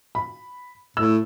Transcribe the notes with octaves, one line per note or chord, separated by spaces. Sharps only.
B5
A2 E6